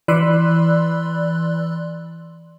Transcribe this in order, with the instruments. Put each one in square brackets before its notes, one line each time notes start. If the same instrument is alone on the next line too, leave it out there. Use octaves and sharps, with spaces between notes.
[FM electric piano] E3 D5 B5 C6 E6 F#6